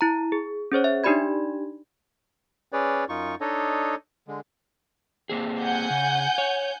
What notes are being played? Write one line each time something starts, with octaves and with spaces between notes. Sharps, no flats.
E4 A#5
G#4
C#4 G#4 C5 C#5
E5
D4 D#4 G4 D5 B5 G#6
C#4 G#4 B4 C#5 D5
F#2 D#4 F4 C#6
D4 D#4 A4 C#5 D#5
D3 G#3
A#3 C4 G#4
F#5 G#5 G6
C#3
C#5